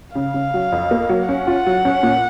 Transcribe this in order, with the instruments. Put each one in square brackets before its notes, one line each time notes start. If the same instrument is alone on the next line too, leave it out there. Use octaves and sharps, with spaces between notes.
[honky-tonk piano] C#3 [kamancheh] F5
[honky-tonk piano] C#3
F#3
F2
A#3
F#3
[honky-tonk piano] C#4 [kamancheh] F#5
[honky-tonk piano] F4
F#3
C#4
A#2